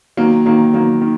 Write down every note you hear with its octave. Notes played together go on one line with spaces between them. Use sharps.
D#3 F#3 A#3
D#3 F#3 A#3
D#3 F#3 A#3
D#3